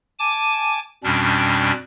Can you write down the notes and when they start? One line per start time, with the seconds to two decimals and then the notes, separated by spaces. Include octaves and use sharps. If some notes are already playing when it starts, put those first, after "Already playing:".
0.19 G#5 A5 D6
1.04 F2 B2 G3 C#4 D4